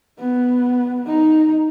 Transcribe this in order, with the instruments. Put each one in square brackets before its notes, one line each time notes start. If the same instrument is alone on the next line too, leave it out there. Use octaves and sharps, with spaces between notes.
[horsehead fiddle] B3
D#4